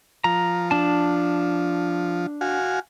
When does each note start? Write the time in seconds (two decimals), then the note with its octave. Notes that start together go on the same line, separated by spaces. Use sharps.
0.24 F3 A#5
0.71 D4 A5
2.41 F#4 F5 G#5